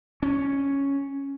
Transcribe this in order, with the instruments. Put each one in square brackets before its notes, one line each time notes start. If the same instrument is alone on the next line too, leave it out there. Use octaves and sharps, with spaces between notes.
[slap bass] C#4